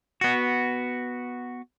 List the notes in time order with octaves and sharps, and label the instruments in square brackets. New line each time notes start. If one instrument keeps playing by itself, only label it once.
[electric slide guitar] B3 F#4